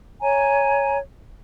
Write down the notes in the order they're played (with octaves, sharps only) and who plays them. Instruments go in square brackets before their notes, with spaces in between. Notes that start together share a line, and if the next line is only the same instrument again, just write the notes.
[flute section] C#5 G#5 A#5